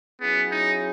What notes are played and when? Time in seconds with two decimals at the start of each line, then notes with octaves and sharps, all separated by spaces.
0.21 F#3 B3 C#4 E4 G#4
0.51 D#4